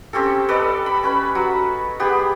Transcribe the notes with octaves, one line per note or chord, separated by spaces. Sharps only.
C4 C#4 G4 A4
A4 B4 D5 D#5
B5
C#4 B4 B5
F#3
B3 G4 G#4